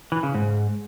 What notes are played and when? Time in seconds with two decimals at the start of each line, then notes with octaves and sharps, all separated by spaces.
0.12 E3
0.23 C#3
0.35 G#2